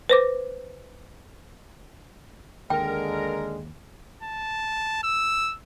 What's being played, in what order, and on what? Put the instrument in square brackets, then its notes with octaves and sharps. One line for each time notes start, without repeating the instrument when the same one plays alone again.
[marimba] B4 C5 D6
[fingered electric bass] D#2 [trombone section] D3 G#3 [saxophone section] A#4 [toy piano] G5
[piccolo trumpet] A5
E6